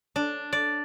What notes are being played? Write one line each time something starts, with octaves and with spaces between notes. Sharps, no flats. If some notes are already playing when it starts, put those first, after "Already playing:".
D4
D5